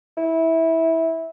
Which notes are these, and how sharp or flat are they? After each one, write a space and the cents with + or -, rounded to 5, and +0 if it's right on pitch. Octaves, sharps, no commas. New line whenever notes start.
E4 -15